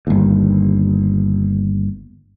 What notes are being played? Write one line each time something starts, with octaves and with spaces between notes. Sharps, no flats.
G1 D#2